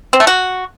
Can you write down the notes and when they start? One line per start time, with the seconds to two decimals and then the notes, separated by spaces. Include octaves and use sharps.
0.13 C4
0.20 A3
0.27 F#4